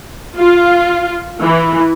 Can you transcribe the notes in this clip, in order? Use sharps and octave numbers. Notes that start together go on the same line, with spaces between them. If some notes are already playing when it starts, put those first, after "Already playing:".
F4
E3